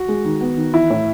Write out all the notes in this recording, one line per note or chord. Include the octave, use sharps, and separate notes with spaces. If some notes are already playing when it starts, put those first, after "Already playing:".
Already playing: F#4
G#3
D#3
B3
D#3
E3 E4
A2